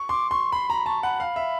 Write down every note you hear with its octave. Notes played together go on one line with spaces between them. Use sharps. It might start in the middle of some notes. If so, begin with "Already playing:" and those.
Already playing: C#6
C6 D6
C6 C#6
B5 C6
A#5 B5
A5 C#6
F#5 B5
F5
E5